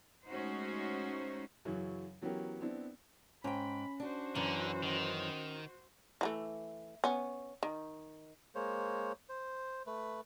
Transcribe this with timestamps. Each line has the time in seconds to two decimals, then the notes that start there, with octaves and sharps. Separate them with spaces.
0.25 G#3 A3 C#4 D#4 F#4 C5
1.65 F#2 C#3 E3 F#3
2.22 E3 F#3 B3 C#4 G4 A#4
2.61 B3 C4 D4 E4
3.44 G#2 C#4 G5 B5
4.00 D4 F#4 C5
4.35 F#2 D3 E3
4.83 D#3
6.21 E3 F#3 A3
7.04 B3 C#4
7.63 D#3
8.55 G#3 A#3 C5 C#5
9.29 C5
9.87 A3 B4